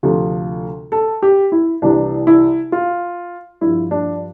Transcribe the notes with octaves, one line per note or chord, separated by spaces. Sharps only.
D2 C3 F3
A4
G4
E4
C2 C3 E3 G3 D4
E4
F4
G2 F3 E4
D4